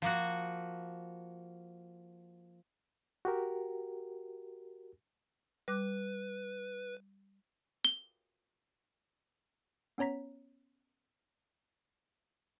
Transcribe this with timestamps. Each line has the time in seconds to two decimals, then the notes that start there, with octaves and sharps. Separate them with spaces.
0.02 F3 A#3 F#4
3.25 F#4 G4 A#4
5.68 G3 B4 D6 F#6
7.85 G7
9.98 B3 C#4 C#5 A#5 B6